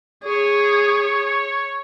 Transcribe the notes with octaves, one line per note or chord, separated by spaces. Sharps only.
G#4 C#5